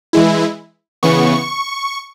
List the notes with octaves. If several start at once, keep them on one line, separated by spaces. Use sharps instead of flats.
E3 G#3 E4
C#3 E3 B3 C#6